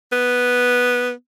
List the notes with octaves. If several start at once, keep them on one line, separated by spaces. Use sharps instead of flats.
B3